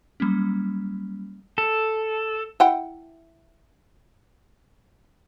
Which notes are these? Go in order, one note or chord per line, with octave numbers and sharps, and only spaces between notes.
F#3 G3 A#3 C#4
A4
E4 F#5 G5